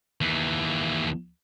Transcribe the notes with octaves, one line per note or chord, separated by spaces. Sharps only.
D#2 E3